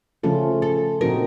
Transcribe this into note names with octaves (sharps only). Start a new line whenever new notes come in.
C#3 F3 A3 C#4 F4 A4
A4
A#2 F3 C4 D#4 F#4 A#4